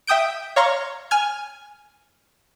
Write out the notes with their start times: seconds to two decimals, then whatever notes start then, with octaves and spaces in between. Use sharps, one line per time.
0.07 E5 G5 D#6 G6 D7
0.56 C#5 F5 A#5 C6 C#6 F6
1.11 G#5 F6 G#6